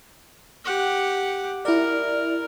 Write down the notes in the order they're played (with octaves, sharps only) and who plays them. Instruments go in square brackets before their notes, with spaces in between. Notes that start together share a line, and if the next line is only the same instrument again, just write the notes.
[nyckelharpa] G4 F#5
[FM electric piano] E4 D5 [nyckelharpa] A#4